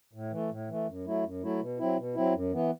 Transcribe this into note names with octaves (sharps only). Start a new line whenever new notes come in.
A2
E3 A3
A2
E3 A3
F#2
F#3 A3 E4
F#2
F#3 A3 E4
B2
F#3 C4 E4
B2
F#3 C4 E4
F#2
E3 B3